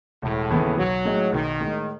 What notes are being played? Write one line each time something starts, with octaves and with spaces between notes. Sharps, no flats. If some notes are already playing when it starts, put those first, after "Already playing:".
E1 A2
D#2 C#3 E3 B3
B1 F#3
A2 G#3 D#4 G#4
B1 D#3
A2 G#3